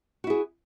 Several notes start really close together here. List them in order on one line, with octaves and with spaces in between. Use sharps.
F#4 E4 G#4